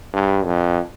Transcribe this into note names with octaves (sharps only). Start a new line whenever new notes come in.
G2
F2